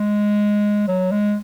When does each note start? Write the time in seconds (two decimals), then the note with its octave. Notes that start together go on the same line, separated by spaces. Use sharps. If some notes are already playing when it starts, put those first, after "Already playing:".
Already playing: G#3
0.88 F#3
1.12 G#3